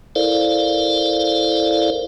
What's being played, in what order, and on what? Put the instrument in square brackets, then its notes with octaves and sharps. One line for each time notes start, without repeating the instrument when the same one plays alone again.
[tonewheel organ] E4 A4 A#4 C5 D5 F5